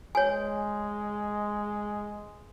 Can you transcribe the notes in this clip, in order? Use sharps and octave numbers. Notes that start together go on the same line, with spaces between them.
G#3 C#5 G#5